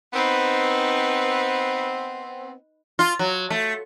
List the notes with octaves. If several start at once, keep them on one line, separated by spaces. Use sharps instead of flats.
B3 C4 D#4 B4
F4
F#3
A3